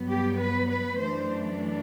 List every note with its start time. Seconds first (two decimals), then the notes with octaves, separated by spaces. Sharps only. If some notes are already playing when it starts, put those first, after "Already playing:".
Already playing: G2 F#3 B3
0.08 G4
0.39 B4
0.69 B4
0.99 F#2 E3 A3 D4 C5